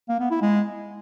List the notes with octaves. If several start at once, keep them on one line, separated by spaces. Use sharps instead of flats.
A#3
B3
E4
G#3